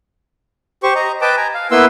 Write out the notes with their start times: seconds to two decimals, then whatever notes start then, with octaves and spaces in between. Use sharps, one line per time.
0.83 G4 C5 C#6
0.95 D#5 A#5
1.21 B4 D#5 G5 A5 D6
1.37 G#5 A#5
1.55 F5
1.71 A#3 B3 E4 B4 C6 E6